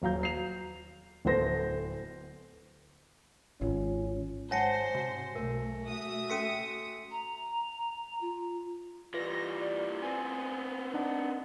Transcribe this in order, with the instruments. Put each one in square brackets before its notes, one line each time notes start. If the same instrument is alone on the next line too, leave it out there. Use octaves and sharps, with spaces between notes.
[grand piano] D#1 F#3 F5 A#5 G6
C7 F7
D1 A3 B3 C5 A#6
[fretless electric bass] G#1 [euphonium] C#4 [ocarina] F4
[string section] G#2 C5 [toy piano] C#5 F#5 A5 [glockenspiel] G#5 A#6 C#7
[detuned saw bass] C3 [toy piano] F#4
[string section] B1 [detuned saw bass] A3 [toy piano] A#4
[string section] F#4 E5 D#6
[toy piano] C#4 A4 C6 [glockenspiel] B6 C#7 D#7
[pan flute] A#5
F4
[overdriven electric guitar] E3 G3 [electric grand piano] F4 B4 [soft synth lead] A#6
[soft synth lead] D5
[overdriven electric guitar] B3 C4 [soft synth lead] G#5
[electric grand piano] D4 D#4 [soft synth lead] F#5